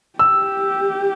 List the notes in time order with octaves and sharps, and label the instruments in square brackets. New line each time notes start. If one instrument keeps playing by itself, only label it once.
[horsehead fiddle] G4 [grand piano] E6